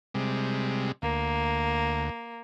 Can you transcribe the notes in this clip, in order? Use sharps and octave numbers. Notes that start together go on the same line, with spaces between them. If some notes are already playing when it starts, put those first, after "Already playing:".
C3 G3 G#3
D2 A#3